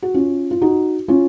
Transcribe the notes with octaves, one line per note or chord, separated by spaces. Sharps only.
F#4
C#4 F4
F4
D#4 F#4
C#4 F4